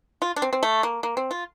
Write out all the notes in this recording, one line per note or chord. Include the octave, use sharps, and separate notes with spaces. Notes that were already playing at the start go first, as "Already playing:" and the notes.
F4
D4
C4
C4
A3
A#3
A#3
C4
F4